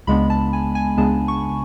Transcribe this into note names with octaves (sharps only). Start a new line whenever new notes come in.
C#2 C#3 G#3 B3 D4 B5
A5
G#5
G#5
C#2 C#3 G#3 B3 D4 A5
C#6